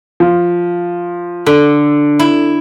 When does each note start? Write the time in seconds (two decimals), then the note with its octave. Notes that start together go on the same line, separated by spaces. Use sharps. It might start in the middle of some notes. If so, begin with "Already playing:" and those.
0.20 F3
1.46 D3 A4
2.19 E4